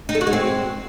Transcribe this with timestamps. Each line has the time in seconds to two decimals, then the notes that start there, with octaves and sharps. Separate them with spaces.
0.09 D#4
0.15 A4
0.21 F#4
0.27 G#3
0.33 C4